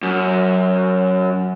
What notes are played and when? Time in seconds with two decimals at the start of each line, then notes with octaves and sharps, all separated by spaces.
0.03 F#2